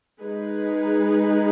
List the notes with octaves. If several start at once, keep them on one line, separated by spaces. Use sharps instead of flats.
G#3 D#4 G#4 B4